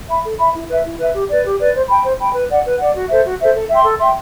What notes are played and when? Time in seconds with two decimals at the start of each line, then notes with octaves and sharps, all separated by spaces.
0.09 E5 B5
0.24 A4
0.39 E5 B5
0.54 E4
0.69 B4 E5
0.85 E4
0.99 B4 E5
1.14 G4
1.29 B4 D5
1.45 G4
1.60 B4 D5
1.74 C5
1.89 G5 B5
2.04 C5
2.20 G5 B5
2.34 B4
2.50 D5 F#5
2.65 B4
2.79 D5 F#5
2.95 F#4
3.09 A4 C5 E5
3.25 F#4
3.39 A4 C5 E5
3.54 A4
3.69 E5 G5 C6
3.84 A4
3.99 E5 G5 C6